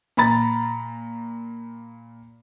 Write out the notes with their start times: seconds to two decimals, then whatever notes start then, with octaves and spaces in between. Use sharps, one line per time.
0.17 A#2 A#5 B5 A6